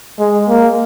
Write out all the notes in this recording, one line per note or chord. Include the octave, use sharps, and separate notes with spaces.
G#3
A#3